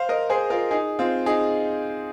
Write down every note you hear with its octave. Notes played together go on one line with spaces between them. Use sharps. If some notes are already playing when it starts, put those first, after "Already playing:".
Already playing: C5 F5
A#4 D#5
G#4 C5
F4 A#4
D#4 G#4
C4 F4
D#4 G#4